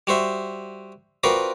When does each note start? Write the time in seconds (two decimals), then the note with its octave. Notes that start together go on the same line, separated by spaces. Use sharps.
0.07 G3 F#4 C5 E5
1.23 C4 F4 F#4 A#4 B4 D5